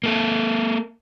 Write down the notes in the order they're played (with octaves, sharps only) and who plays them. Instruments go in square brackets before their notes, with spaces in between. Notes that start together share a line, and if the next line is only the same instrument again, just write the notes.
[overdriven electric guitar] A#3 A4